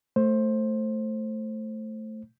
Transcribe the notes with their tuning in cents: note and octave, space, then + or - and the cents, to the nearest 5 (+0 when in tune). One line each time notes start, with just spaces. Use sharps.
A3 +0 C5 +15